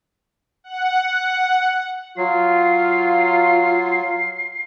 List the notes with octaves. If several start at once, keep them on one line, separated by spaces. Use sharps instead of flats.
F#5
F#3 F4 C7